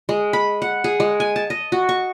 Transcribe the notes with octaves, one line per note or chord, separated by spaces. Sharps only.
G#3
B5
F#5
G#4
G#3
G#5
A5
D#5
F#4
C#6